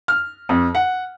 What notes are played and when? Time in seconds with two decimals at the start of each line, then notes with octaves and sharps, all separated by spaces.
0.08 F6
0.49 F2
0.75 F#5